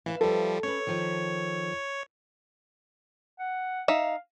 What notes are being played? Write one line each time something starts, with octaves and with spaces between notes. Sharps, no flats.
E3 B4 E5 F5
F3 G3 A4
C#4 B4 C#5
D#3 F3
F#5
D#4 E5 F5